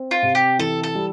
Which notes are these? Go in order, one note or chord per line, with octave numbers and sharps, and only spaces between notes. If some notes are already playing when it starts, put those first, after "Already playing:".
Already playing: C4
F4
C3
G4
E3 A4
A4
G3